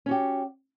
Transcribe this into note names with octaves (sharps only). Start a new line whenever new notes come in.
C#4 F#4 G4